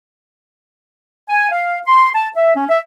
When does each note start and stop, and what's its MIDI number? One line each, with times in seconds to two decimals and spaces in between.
1.29 1.52 80
1.52 1.80 77
1.87 2.10 84
2.15 2.29 81
2.37 2.55 76
2.56 2.65 61
2.69 2.79 76